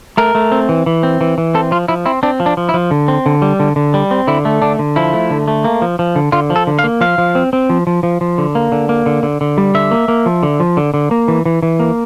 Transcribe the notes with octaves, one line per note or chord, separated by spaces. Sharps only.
A3 A#4
A3
C4
E3
E3
C4
E3
E3
C4 A4
F3 F4
F3 E4
C4 E4
C4 D4
F3
D4
F3
E4
F3
D3
C4
D3
G3
D3
D3
G3
C4
D3 E4
A3
D3 D4
D3
F3 E4
A3
D3
A3
A#3
F3
F3
D3
D3 F4
F3
A4
D3
F5
A#3
F3 F5
F3
C4
C4
F3
F3
F3
F3
D3
A#3
D3
A#3
D3
D3
D3
G3
D3 E5
A#3
A#3
F3
D3
F3
D3
D3
A#3
E3
E3
E3
A#3